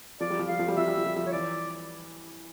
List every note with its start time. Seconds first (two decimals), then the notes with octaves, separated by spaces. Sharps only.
0.21 F3 D5
0.30 G3
0.39 F3
0.48 G3 F5
0.59 F3
0.68 G3
0.77 F3 E5
0.88 G3
0.97 F3
1.06 G3
1.16 F3
1.27 C#5
1.32 E3 D5